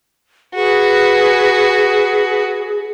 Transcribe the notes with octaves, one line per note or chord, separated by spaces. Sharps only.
F#4 G#4 B4